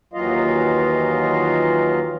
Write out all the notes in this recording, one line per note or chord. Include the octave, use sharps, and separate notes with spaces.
D#2 E3 F#3 F4 D#5 F5